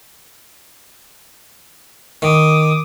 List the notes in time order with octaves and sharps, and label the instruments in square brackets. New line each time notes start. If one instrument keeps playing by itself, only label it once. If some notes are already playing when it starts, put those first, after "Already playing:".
[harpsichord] D#3 [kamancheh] D6 D#6